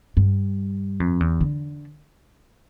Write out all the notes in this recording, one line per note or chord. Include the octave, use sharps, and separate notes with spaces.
G2
F2
E2
D3